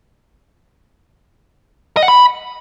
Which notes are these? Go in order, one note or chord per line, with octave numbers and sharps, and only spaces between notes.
D#5
F#5
B5